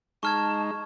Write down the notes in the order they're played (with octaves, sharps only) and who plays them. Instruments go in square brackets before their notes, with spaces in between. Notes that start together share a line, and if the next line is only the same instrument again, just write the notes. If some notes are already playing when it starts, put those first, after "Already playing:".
[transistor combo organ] G#3 D#4 [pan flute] A5 [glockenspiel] C#6 F6 G#6